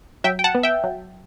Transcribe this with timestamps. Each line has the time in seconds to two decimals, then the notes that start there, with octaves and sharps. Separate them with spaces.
0.24 F#3 E5 G5
0.39 G5
0.44 F#5 A5
0.55 B3
0.63 E5 G5
0.84 F#3